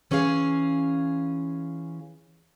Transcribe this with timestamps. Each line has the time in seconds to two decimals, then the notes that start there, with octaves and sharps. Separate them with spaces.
0.11 E3 C#4 F4 G#4 F5